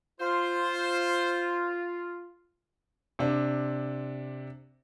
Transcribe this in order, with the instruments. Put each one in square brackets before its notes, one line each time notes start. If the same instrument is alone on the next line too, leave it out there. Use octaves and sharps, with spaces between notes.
[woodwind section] F4 [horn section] C5
[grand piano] C3 D4